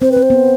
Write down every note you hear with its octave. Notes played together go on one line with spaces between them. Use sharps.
C4 C5
C4 B4
C5
B3